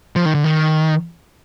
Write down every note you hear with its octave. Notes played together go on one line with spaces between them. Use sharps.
F3
D#3
D3
D#3